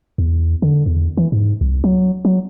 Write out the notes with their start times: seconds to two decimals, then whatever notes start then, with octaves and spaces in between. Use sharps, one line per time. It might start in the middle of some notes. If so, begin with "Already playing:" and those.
0.18 E2
0.62 D3
0.86 E2
1.17 E3
1.32 G#2
1.61 C2
1.84 F#3
2.25 F#3